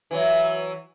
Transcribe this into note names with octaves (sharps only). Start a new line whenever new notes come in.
E3 F#3